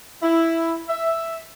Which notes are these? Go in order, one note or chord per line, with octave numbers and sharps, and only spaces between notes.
E4
E5